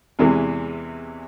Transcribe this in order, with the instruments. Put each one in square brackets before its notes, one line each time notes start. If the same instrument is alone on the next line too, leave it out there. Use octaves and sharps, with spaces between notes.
[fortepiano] E2 C3 E3 G#3